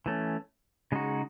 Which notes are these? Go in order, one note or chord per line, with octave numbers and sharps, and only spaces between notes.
E3 A3 C#4
C#3 G#3 D#4 F#4